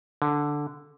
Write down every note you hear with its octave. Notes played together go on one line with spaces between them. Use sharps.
D3